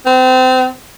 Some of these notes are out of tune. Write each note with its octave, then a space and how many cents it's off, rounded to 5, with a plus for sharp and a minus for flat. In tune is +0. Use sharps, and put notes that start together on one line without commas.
C4 -30